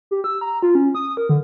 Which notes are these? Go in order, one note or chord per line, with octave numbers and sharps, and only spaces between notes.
G4
E6
A#5
F4
C#4
D#6
A#4
D3